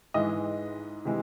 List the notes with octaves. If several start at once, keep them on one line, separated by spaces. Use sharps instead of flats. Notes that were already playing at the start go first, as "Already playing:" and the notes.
G#2 E3 G#3 D#5
C3 E3 G#3